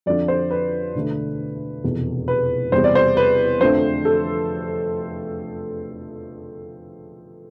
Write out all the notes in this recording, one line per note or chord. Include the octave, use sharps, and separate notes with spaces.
F2 D3 F3 D5
C5
B4
E1 D2 D3 A3
F1 E2 B2
B4
E2 C3 G3 B3 C5
D5
C5
B4
F2 D3 F3 A3 C5
A4